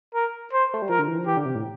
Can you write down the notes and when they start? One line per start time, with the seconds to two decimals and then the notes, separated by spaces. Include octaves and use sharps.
0.15 A#4
0.53 C5
0.74 A3
0.82 G3
0.89 F3 A#4
0.99 D3
1.08 E3
1.18 F3
1.27 E3 G4
1.37 D3
1.45 C3
1.55 A2